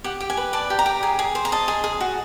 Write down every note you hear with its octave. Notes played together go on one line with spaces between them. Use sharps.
G4 F#5
G4
G#5
B4
D5 A5
G4
A#5
G4
G#4
G#4
C5
A#5
D#5 A5
G#4
G#4
F#4